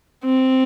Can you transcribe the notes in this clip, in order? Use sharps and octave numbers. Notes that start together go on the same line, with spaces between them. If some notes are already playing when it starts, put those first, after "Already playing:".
C4